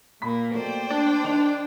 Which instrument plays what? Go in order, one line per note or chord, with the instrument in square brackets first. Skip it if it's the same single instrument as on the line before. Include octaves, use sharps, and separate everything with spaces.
[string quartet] A#2 A#3 [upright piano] B5 B6
[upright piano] B2 A3 A#3 [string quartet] C5 D5 G5
[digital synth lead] D4
[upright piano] D#3 D#5 F7